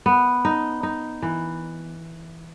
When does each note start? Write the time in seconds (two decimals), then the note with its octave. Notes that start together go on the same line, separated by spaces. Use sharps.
0.06 B3
0.45 D#4
0.83 D#4
1.22 E3